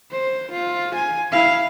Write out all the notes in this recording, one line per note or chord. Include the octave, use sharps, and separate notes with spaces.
C5
F4
G#5
E4 F5